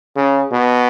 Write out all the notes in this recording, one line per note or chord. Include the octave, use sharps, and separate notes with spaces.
C#3
B2